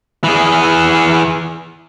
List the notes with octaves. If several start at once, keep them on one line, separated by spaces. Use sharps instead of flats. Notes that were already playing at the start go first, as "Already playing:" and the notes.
E3 G#4